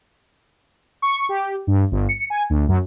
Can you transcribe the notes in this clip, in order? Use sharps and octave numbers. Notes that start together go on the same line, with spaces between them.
C#6
G4
G2
G1
C#7
G#5
D2
F#2